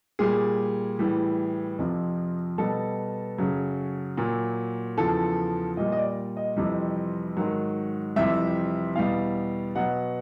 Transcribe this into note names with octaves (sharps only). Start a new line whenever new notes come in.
A#2 G3 G#4
A2 E3 G3
F2 C3 F3
B2 G3 A4
F#2 C#3 F#3
A#2 F#3
E2 C#3 F3 A4
A#2 G3 D#5
D#5
D5
D#5
F2 C3 E3 G3
G#2 D#3 F#3
F2 C3 E3 G3 E5
E2 B2 G3 F5
B2 F#3 F#5